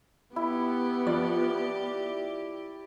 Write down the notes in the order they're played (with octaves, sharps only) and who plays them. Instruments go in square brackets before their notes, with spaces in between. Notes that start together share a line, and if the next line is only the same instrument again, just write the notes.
[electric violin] B3 [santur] E4 [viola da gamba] G4
[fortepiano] F3 [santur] D5